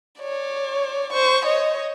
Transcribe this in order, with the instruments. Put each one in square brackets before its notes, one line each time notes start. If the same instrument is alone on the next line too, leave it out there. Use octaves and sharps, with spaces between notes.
[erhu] C#5 [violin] D5
[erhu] C5 [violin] C#6
[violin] C#5 [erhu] D#5